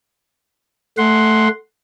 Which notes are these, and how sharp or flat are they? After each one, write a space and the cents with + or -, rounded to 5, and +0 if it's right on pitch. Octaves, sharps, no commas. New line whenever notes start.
A3 +0 F#5 +0 C6 +0